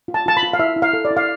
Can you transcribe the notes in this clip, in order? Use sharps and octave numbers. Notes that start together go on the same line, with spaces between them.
F4
A5
F4 A5
B5
F4
F5
E4 E5
E4
F5
A4
D5
E4
F5